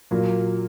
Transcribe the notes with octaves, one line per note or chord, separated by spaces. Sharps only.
A#2 F#3 A#3